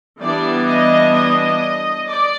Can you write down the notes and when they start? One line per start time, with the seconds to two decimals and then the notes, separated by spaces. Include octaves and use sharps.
0.20 E3 G3 B3 D4 D5
0.66 D#5
1.14 D#5
2.07 D5